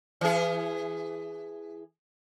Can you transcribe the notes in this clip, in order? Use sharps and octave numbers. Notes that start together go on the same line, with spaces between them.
E3 G#4